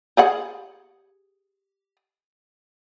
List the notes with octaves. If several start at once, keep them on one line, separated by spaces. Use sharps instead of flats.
G4 G#4 F#5